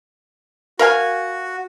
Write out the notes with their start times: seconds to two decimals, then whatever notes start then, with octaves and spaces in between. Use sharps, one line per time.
0.79 F#4 A#4 F5 G#5